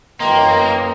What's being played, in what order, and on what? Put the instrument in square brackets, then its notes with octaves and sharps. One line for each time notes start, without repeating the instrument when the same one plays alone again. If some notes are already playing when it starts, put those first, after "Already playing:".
[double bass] F#2 E3 [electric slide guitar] A#3 [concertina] D#5 A#5 C6 [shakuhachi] G5